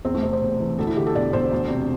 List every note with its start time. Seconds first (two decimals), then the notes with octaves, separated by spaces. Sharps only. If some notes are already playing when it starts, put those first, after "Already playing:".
0.05 E2 C4
0.15 A3
0.23 C3 C4
0.33 C5
0.41 E1
0.60 E3
0.79 D2 A4
0.87 E4
0.96 D3 G4
1.07 A4
1.15 E1 D5
1.33 E1 C5
1.51 D2
1.70 C3